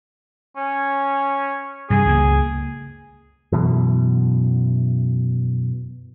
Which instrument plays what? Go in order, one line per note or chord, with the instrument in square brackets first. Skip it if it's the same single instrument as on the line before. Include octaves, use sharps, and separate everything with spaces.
[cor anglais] C#4
[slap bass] G2 C3 [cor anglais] G#4
[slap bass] C#2 F3 A#3
[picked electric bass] F#2 B2 E3